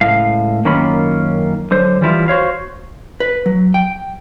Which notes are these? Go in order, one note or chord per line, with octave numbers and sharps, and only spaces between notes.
C#2 A2 F5
F#2 D#3 A#3 C#4 F4 B5
D3 F#3 C5
E3 G3 E4 F4
F#4 C5 C#5 F5
B4
F#3
G5